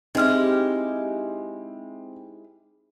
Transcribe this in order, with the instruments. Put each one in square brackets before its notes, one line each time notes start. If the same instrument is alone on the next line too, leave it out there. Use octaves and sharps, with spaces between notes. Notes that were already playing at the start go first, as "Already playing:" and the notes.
[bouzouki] G#3 E4 G4 [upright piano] C4 [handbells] D#4 F6